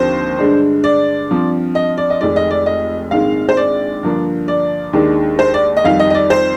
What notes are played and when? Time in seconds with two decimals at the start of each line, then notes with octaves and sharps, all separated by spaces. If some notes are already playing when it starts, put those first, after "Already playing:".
Already playing: D#2 D3 F3 C4 C5
0.38 G2 D3 G#3 D4
0.84 D5
1.29 G2 F3 C4
1.75 D#5
1.98 D5
2.10 D#5
2.20 F1 F2 D#3 G#3 D5
2.36 D#5
2.51 D5
2.66 D#5
3.11 A#1 G#2 D#3 G#3 C4 F5
3.49 C5
3.57 D5
4.03 G2 D3 F3 A#3 D4
4.48 D5
4.93 D#2 D#3 G#3 D4
5.39 C5
5.54 D5
5.77 D#5
5.84 F2 D#3 G3 F5
6.00 D#5
6.10 D#5
6.15 D5
6.30 C5